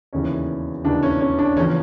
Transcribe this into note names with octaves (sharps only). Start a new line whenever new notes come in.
E1 D#2 C#3 E3 C#4
E1 D#2 C#3 E3 D4
C#4
C#4
D4
E2 C#3 F3 C#4